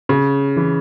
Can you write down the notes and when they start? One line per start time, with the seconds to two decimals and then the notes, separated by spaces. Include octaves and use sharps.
0.09 C#3
0.57 E3